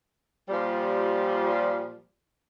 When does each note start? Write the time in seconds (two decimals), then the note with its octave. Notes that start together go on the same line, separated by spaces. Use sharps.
0.49 A#2 F3 G3